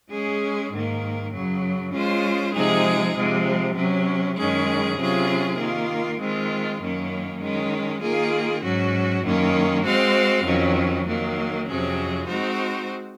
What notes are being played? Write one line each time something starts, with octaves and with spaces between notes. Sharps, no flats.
G#3 C#4 G#4
G#2 D#3 A#3
F#2 C#3 F#3
G#3 C#4 F4 C5
C3 F3 G#3 D#4 G#4
C3 F3 G#3
C3 F#3 C#4
F#2 D#3 G#3 C#4 G#4
C3 F#3 C#4 F4 G#4
D#3 A#3 F4
D#3 G#3 C4 F4
F#2 D#3 A#3 C#4
D#3 G#3 C#4
D#3 A#3 F4 G#4
G#2 F#3 C#4 F#4
F#2 D#3 A#3 C#4
G#3 C4 F#4 C5 F5
F2 D#3 F#3 C#4
D#3 F#3 A#3
F2 C3 F#3 C#4 G#4
G#3 C4 D#4 F#4 C5